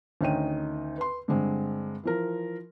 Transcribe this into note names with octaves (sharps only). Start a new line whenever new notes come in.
D2 D#3 C#4 D#4 G5 D#7
B4 C6
G2 D3 G#3 C4
E3 F3 A#4